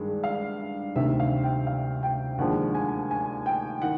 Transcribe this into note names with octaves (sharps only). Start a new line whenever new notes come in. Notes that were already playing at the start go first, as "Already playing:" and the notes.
Already playing: G2 D#3 G#3
F5
D2 C3 D#3 E5
F5
G5
F5
G5
D#2 D3 F3 G#3 F#5
G#5
G#5
G5
D#3 F#5